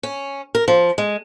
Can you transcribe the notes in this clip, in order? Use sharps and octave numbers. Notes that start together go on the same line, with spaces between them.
C#4
A#4
F3
G#3